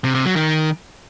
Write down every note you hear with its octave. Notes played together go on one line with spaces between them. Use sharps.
C3
C3
F#3
D#3